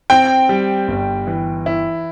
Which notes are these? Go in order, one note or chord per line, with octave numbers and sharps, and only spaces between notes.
C4 G5
G3
G1
E3
E4